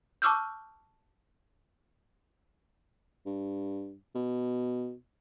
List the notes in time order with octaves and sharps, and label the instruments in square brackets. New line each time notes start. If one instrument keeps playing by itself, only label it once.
[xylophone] A5 C#6 D6 E6 F6 G6
[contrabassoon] G2
B2